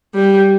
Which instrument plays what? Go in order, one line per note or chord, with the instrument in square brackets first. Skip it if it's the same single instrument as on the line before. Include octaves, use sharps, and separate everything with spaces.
[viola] G3